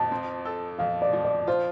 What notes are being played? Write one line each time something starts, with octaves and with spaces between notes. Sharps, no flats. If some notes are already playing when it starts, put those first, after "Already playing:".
Already playing: F2 F3 A5
C4
A4
F2 F5
D5
F3
D5
F4 C5